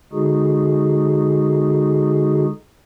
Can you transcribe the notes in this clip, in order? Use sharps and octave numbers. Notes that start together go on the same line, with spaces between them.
D3 G#3 D#4 F#4 G#4